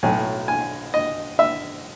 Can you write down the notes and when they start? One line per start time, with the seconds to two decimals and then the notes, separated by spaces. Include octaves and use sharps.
0.03 B1 A2 F#3 G#5
0.48 G#5
0.94 D#5
1.39 E5